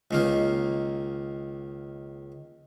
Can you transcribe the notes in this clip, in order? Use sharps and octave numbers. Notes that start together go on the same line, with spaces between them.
C#2 D#3 A#3